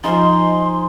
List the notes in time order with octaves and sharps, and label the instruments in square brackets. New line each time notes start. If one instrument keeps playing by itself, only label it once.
[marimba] F3 F4 [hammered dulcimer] D#4 G#4 C5 [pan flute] C6